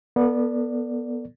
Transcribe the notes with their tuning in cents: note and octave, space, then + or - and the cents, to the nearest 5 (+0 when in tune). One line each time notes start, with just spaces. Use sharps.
B3 -20 A4 +20 D5 +0